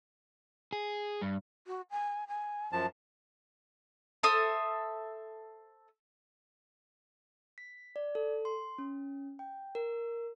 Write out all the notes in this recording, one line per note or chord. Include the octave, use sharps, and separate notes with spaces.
G#4
G2
F#4
G#5
G#5
F#2 F3 A5
A4 C5 E5 D#6
B6
D5
A4
C6
C#4
G5
A#4